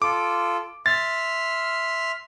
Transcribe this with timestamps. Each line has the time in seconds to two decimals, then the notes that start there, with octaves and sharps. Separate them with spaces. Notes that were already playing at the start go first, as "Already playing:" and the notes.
0.02 F4 A4 D6
0.86 E5 C6 F6 A6